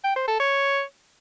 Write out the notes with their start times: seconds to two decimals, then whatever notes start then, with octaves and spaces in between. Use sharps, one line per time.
0.04 G5
0.16 C5
0.28 A4
0.40 C#5